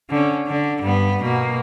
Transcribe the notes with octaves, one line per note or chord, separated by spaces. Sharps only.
D3 C#4
D3
G2 B3
B2 A#3